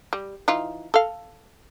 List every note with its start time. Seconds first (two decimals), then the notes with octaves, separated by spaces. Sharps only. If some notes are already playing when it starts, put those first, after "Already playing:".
0.13 G3
0.48 E3 D#4 F4
0.94 A4 F5